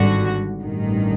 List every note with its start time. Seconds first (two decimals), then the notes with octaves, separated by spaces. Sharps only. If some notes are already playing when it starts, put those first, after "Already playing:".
Already playing: G#1 G2 D3 F#4
0.61 A1 G2 D#3